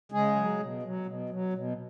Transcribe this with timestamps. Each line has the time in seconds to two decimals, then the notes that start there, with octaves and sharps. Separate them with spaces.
0.12 C#3 G#3 G#4
0.36 F#3
0.59 B2
0.83 F#3
1.06 B2
1.30 F#3
1.54 B2